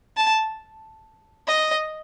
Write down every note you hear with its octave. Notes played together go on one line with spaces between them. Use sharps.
A5
D#5